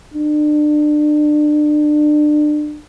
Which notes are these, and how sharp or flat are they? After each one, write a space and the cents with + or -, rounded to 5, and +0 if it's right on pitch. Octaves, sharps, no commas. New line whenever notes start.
D4 +30